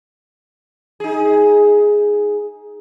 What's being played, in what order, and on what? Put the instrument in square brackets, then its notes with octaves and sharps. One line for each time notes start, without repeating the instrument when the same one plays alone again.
[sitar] D#4 G#4